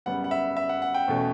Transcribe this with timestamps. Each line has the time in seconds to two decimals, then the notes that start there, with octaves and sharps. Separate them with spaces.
0.06 F#2 C#3 G3 B3 F#5
0.24 F#5
0.31 E5
0.57 E5
0.69 F#5
0.82 F#5
0.94 G5
1.08 E2 B2 A3 C#4